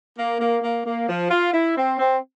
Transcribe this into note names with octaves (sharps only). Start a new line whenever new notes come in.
A#3
A#3
A#3
A#3
F3
F4
E4
C4
C4